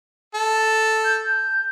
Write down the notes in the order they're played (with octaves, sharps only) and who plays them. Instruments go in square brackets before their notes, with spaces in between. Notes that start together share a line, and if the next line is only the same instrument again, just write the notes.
[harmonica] A4
[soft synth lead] G6